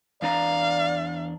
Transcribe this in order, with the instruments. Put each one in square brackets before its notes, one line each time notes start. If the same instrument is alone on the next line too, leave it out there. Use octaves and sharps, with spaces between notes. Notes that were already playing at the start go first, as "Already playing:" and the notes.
[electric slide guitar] E2 D4 A#5 [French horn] D5 [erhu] F5